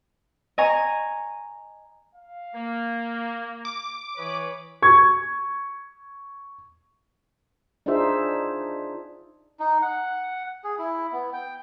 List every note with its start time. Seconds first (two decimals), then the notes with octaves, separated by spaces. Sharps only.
0.58 D#5 G#5 A#5 C#6
2.15 F5
2.54 A#3
3.65 D6
4.17 E3 B4 C#5 D#6
4.82 C#6 G#6
7.86 D4 D#4 F4 G#4 C5 E5
9.60 D#4
9.82 F#5
10.64 G#4
10.78 E4
11.13 B3
11.33 G5